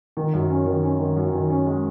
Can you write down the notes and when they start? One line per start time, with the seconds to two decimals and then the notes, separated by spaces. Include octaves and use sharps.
0.17 D#3
0.34 F#2
0.50 C#4
0.66 D#3
0.83 C#4
0.99 D#3
1.17 F#2
1.33 D#3
1.50 C#4
1.67 G#3